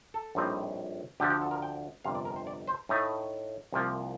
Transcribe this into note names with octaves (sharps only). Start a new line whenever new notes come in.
A4
A#1 A2 G3 C4 D#4
D2 D3 F3 G4
G4
A4
A#4
G5
G1 F2 C3 F5
D5
A#4
C5
D5
C5
A2 A3 D#4
C2 C3 F3 A#3